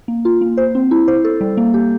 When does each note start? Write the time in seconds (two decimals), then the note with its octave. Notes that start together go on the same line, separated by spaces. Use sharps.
0.08 A#3
0.25 F4
0.41 A#3
0.57 C5
0.75 C4
0.91 E4
1.08 C5
1.24 A4
1.41 G3
1.57 A#3
1.74 G4